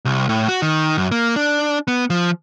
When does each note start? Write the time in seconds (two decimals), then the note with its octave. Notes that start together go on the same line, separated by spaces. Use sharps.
0.05 C2
0.29 A2
0.49 F#4
0.62 D#3
0.98 F#2
1.11 A#3
1.36 D4
1.88 B3
2.10 F3